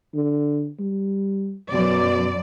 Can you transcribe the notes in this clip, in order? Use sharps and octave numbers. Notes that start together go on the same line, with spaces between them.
D3
G3
F#2 B2 D5